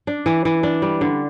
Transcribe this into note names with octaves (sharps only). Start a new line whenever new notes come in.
D4
E3
E3
D4
G3
D3